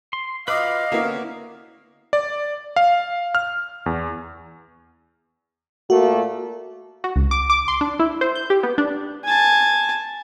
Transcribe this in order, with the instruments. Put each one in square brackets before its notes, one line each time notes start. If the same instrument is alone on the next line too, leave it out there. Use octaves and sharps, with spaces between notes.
[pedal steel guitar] C6
[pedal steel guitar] F4 F#4 B4 [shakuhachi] D#5 [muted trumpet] F5 [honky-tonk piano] D6 D#6
[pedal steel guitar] D3 C#4 [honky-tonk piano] A#3 B3 E4
[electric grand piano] D5
F5
F6
E2
[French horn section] A#2 A3 A#3 [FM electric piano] F#4
[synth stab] F#4
C#2
D6
D6
C6
D4
E4
C5
G6
G4
B3
D4
[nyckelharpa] G#5 A5